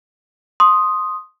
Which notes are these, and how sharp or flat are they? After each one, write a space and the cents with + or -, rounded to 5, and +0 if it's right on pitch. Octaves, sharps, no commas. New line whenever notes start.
C6 +10 D#6 +0